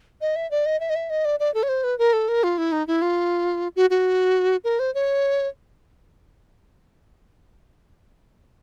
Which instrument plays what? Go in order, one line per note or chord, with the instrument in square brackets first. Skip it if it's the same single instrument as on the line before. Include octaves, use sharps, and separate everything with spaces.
[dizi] D#5
E5
D5
D#5
E5
D#5
E5
D#5
D5
D5
A4
C#5
C5
B4
A#4
A4
A#4
F4
E4
D#4
E4
F4
F#4
F#4
A#4
C5
C#5